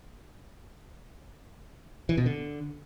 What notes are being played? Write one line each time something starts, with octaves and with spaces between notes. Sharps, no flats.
E3
B2
D3